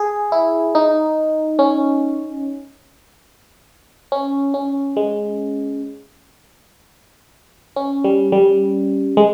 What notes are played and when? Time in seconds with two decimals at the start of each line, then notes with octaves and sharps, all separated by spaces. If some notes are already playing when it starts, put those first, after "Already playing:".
Already playing: G#4
0.32 E4
0.75 D#4
1.59 C#4
4.12 C#4
4.54 C#4
4.97 G#3
7.76 C#4
8.04 G3
8.32 G3
9.17 G#3